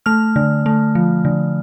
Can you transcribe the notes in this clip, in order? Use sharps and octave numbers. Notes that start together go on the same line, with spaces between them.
A3 F6
D3
A3
F3
D3